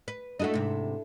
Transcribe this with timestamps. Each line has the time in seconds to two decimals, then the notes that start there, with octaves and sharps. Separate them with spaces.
0.08 B4
0.40 A3 D4 E4 F#4 A4 D#5
0.54 G#2 C3